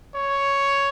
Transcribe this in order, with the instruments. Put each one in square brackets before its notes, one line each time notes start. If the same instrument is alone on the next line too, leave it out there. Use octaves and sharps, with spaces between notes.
[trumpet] C#5